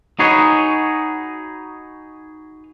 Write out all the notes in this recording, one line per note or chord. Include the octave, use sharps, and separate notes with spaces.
D#4 F#4 G#4 B4 C#5